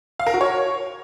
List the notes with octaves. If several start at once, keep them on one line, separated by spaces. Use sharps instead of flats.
F5
A#4
F#4
C#5